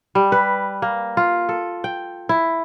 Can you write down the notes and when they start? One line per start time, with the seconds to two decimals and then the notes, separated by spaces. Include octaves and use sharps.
0.15 G3
0.32 B4
0.82 A#3
1.17 F4
1.49 A4
1.84 G5
2.29 E4